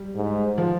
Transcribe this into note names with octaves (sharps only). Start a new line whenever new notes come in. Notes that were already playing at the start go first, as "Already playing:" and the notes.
Already playing: G3
G#2
F3